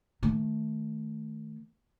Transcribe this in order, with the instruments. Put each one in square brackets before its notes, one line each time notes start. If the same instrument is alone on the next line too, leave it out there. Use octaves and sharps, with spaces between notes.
[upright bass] D#3 A3